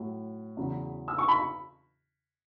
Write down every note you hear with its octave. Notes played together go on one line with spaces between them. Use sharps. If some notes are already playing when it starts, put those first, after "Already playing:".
Already playing: A2 F#3
E2 C#3 F#3
E6
C#6
B5